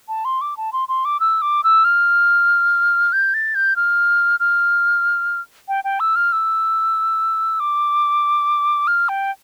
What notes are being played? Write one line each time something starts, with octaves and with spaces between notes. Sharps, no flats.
A5
C6
D6
A5
C6
C6
D6
E6
D6
E6
F6
G6
A6
G6
F6
F6
G5
G5
E6
F6
E6
D6
F6
G5